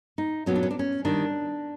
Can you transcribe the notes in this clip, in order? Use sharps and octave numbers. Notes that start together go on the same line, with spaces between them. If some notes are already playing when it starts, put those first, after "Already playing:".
D#4
A#2 F#3 B3 C#4
D4
C#4
D4
C#4
D#3 G3 D4